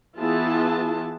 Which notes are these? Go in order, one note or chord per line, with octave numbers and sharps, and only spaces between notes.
E3 B3 E4 F4 G#4 A5